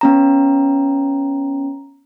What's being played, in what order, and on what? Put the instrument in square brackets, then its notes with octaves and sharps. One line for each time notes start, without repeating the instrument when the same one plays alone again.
[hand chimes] B3 C#4 A#5